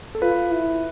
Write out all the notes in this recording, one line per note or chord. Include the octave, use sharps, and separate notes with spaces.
A4
F4 B4
E4